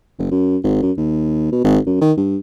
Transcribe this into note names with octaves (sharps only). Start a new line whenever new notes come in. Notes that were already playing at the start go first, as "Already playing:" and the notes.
F#1
F#2
G#1
F#2
D#2
B2
G#1
F#2
D#3
G2